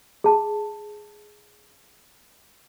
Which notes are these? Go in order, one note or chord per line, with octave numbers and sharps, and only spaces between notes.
G#4 A5